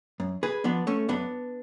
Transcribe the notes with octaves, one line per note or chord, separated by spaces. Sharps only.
F#2
G#4 B4
F3 B3 D4
A3 C#4
F#2 B3 D4